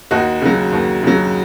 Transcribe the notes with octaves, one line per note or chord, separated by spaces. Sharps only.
D#2 D#4 F#4
C#3 F#3
D#2
C#3 F#3